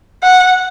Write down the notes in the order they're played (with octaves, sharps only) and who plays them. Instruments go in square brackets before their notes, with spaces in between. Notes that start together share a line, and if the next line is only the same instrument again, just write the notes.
[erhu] F#5